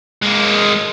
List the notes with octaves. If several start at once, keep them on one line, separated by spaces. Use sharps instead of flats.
G#3 A#3